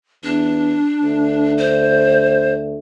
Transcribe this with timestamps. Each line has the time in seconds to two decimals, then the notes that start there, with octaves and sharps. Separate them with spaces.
0.24 E2 D4
1.03 D2
1.58 C5